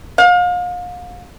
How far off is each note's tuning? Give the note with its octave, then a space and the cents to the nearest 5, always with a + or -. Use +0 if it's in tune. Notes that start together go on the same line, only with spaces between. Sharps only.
F5 +35